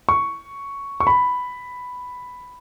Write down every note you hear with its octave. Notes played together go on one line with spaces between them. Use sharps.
C#6
C#6
B5